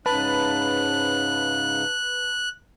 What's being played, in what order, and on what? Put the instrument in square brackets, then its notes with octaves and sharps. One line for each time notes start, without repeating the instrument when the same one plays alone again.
[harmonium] G#2 C#3 [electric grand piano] B4 A5 B5 [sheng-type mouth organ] F#6